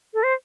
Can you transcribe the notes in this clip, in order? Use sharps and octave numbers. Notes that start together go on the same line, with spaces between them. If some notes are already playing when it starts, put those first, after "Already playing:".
A4
C5